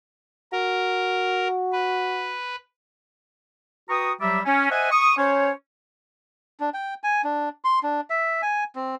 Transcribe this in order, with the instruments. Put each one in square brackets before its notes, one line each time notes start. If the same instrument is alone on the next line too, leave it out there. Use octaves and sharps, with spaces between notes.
[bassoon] F#4 [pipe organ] A#4
[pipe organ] B4
[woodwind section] F#4 B4 G5 A#5 C#6 D#6
F#3 G3 G4 D5 E5
C#4
C5 D#5 E5 F#5 G#5
C#6 D#6
C#4 C5 C#5
[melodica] D4
G5
G#5
D4
C6
D4
E5
G#5
C4